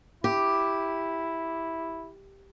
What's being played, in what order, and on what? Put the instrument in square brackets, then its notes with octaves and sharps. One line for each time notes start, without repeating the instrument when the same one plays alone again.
[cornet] E4 [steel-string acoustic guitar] G4